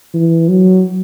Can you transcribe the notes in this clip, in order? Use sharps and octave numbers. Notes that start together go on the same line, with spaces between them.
E3
F#3